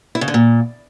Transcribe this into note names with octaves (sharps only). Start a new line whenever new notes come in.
E4
C#3
D3
A#2